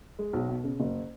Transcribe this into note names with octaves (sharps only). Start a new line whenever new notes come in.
G#3
B1
B2
C#3
F#1